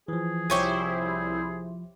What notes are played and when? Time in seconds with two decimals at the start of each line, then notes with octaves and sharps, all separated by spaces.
0.08 E3 F3 G#4
0.50 C2 F3 E4 G4 C5 C#5 G#5